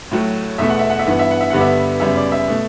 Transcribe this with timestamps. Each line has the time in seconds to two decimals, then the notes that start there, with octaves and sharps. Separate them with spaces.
0.11 A2 F#3 A3
0.58 E2 B2 A3 E5
0.69 F#5
0.79 E5
0.90 F#5
0.99 E5
1.06 G2 E3 B3 F#5
1.19 E5
1.31 F#5
1.41 E5
1.50 G2 D3 G3 B3 F#5
1.61 E5
2.00 F#2 C#3 G3 B3 E5
2.16 D5
2.32 E5
2.48 B2 A3